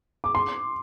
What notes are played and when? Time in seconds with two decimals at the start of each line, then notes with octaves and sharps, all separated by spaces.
0.24 D6
0.35 C6